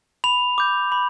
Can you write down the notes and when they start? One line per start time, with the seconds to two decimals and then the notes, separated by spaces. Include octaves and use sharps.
0.24 B5 F7
0.58 D6 G6
0.92 B5